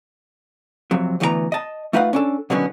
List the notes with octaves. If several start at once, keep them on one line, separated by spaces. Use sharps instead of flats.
F2 C3 F#3
D2 E3 A3 B3 A4 A#5
D#5 A5
A3 D#4 F4 B4 F5 F#5
C#4 D4 A4
B2 D3 D#3 F#3 B3 C#4